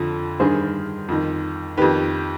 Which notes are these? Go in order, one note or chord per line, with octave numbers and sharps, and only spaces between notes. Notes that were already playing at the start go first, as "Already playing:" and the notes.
Already playing: F2 D3 F3
G2 D#3 G#4 C5
F2 D#3
F2 D#3 G4 B4